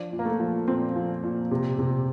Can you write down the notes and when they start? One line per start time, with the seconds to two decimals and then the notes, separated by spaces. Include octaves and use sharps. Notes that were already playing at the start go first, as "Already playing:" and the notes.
Already playing: F3 D4
0.12 A#2
0.19 A#3
0.25 A3
0.40 F3
0.67 A#2 C4
0.96 F3
1.23 A#2
1.51 C3
1.79 C3